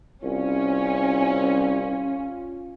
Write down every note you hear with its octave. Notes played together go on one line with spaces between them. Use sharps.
C2 C#4 F4